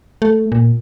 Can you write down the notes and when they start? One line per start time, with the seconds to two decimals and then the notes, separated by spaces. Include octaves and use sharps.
0.22 A3
0.52 A#2